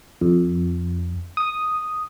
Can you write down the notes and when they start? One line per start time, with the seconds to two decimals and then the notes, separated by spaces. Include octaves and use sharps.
0.21 F2
1.37 D#6